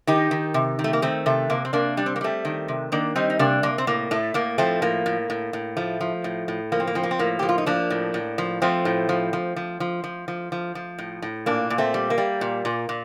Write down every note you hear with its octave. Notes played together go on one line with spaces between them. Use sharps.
D#3 D#4 G4
D#3
C3
D#3
A3
A#3
D#3 A3 C4
C3 A3
C3 A#3
C4
C3 A#3 D4
G3 D4
C4
A#3
G3 A3 C4
D#3
C3
D#3 A#3 D4
G3 C4 D#4
D#4
C3 A#3 D4
C3 A#3
C4
A2 A#3
A2 A3
A2 A#3
F3 A3 C4
A2 A#3
A2
A2
A2
F3 A3
F3
A2
A2
F3 A#3
C4
A#3
F3 C4
A#3
C4
A2 A#3
F3 G4
F4
D#4
F3 A#3 D4
A2
A2
F3
F3 A3 C4
A2
F3
F3
F3
F3
F3
F3
F3
F3
A2
A2
A#2 A#3 D4
A#2
A3 C4
G3
A#3
G3
A#2
A#2
A#2